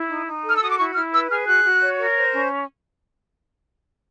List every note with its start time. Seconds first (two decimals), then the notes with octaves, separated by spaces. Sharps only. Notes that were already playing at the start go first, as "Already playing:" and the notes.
Already playing: E4
0.09 D#4
0.27 D#4
0.44 A4 F6
0.56 E6
0.61 F#4 D#6
0.70 D6
0.78 E4 C#6
0.95 E4 F6
1.12 B4 E6
1.29 G#4 F6
1.47 F#4 F#6
1.64 F#4
1.81 C#5
1.99 A#4
2.16 C5
2.32 C#4